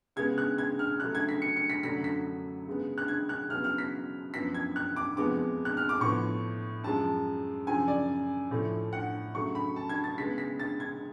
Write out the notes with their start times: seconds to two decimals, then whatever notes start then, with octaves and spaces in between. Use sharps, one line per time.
0.16 C#3 G#3 B3 G#6
0.38 F#6
0.58 G#6
0.79 F6
1.00 C#3 F#3 A3 F#6
1.15 G#6
1.29 B6
1.42 C#7
1.56 C#7
1.70 B6
1.83 F#2 D3 F#3 A3 B6
2.04 B6
2.67 C#3 G#3 B3
2.98 F#6
3.08 G#6
3.29 F#6
3.50 C#3 F#3 B3 F6
3.64 F6
3.78 B6
4.34 F#2 F3 B3 B6
4.54 G#6
4.76 F#6
4.96 D6
5.17 F2 F3 G#3 B3 D6
5.65 F#6
5.77 F6
5.89 D6
6.00 A2 F3 B3 C#6
6.84 F#2 F3 G#3 A5
7.67 F#2 C#3 F3 G#5
7.88 D5
8.51 A2 F3 A3
8.93 F#5
9.34 C#3 F#3 A3 C#6
9.55 B5
9.76 A5
9.89 G#6
10.04 A6
10.18 C#3 G#3 B3 B6
10.38 B6
10.60 A6
10.80 G#6